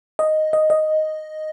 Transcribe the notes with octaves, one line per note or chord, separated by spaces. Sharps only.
D#5
D#5
D#5